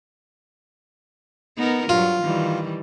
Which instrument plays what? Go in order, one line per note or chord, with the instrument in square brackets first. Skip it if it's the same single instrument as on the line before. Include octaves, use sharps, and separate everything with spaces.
[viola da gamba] B3 D#4 A#4
[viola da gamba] G2 F#3 [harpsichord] F4
[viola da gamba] D#3 E3 G3